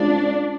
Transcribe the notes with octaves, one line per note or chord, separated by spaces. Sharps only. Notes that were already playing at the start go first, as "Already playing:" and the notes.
Already playing: G#3 C#4 D4 F4 G#4 C5